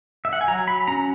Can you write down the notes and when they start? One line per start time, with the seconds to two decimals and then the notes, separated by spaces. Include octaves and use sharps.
0.25 E5
0.33 F#5
0.41 G#5
0.48 F#3 A#5
0.68 B5
0.88 C#4 A#5